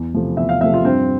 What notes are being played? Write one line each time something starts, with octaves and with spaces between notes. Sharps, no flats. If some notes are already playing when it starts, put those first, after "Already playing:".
Already playing: E2
C3 F3 A3
E2 E5
F5
C3 F3 A3 E5
F4
G2 C4